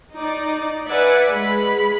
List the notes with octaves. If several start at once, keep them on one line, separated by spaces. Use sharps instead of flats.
D#4 D5
B4 D5 E5 F#5 G#5
G#3 B5